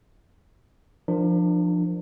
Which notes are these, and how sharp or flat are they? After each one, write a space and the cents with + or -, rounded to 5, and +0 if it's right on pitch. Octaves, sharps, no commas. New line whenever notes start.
F3 +0 D4 +30 A#4 +0